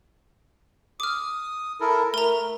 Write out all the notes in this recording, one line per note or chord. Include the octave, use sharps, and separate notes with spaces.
D6 D#6 F6
E4 A4 A#4
A3 A#4 A#5